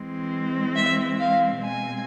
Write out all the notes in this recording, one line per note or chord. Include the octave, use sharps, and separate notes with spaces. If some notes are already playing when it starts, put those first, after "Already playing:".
Already playing: E3 G#3 C4
E5
F5
B2 G#3 C4 G#5